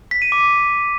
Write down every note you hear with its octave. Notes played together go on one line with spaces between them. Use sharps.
B6
D#7
D6